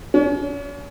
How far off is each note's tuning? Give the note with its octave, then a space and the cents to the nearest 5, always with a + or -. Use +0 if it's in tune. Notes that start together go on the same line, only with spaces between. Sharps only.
C#4 +40